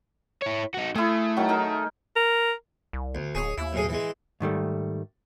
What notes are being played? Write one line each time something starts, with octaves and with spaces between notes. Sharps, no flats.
E4 C#5
D#4 F#4
A3 E4 G#4
D#3 F#3
D#4 G#4 A#4
A#4
C2
D2
D1 G#4 C#5
D#2 E4
B1 A2 G#4
E3 G#3
G#2 D#3 G3 A3